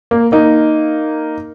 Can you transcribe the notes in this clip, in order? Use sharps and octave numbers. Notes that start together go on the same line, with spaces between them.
A#3
A#3 D#4